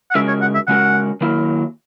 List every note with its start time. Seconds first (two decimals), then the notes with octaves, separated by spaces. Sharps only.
0.11 F#5
0.15 C#3 G#3 C#4 F#4 A#4 E5
0.28 C#5
0.41 F#5
0.55 E5
0.67 C#3 G#3 C#4 F#4 A#4 F#5
1.21 D#3 F#3 A#3 E4 A#4